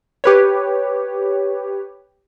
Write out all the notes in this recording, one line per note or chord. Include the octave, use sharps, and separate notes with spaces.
G4 B4 C#5